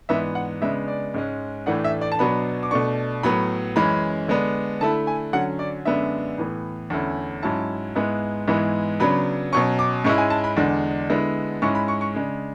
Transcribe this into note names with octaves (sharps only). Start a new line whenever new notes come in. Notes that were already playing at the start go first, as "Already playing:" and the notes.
G#2 E3 B3 D4 E5
F#5
C#3 G#3 B3 D4 E5
D5
G#2 G#3 C#4
A2 E3 A3 D4 F#5
E5
D5
A5
B2 F#3 B3 D4 B5
D6
B2 A3 D4 C#6
A2 F#3 B3 B5
F#2 E3 G#3 C#4 B5
D3 G#3 B3 D4
D3 A3 E4 A5
G#5
D3 F#3 C#4 F#5
D5
F#2 D3 G#3 B3 D4 E5
A2 E3 B3
E2 D3 A3 C#4 E4
G#2 F#3 C#4 E4 A5
G#2 G#3 B3 E4
G#2 E3 G#3 B3 E4
C#3 F#3 B3 D4 B5
B2 F#3 C#4 C#6
D6
G#2 G#3 C#4 E4 C#6
G#5
A5
B5
E2 D3 G#3 D4
D3 G#3 B3 E4
G#2 G#3 C#4 E4 C#6
B5
C#6
C#6
C#3 G#3 D4